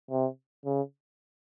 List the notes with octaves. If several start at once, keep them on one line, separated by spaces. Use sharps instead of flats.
C3
C#3